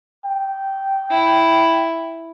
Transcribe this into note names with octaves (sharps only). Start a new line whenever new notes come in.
G5
E4